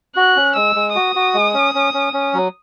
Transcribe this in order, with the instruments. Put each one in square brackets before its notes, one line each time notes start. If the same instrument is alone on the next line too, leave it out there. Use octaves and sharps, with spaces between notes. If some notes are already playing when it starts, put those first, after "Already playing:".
[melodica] F#4 [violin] F#6
[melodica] C#4
[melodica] G#3 [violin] E6
[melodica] G#3
[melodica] F#4 [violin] D#6
[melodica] F#4
G#3
C#4
C#4
C#4
C#4
F#3